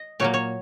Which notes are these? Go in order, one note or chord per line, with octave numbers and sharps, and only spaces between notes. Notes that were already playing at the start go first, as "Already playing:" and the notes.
Already playing: D#5
A#2 F#3 A#3 C#5
C#5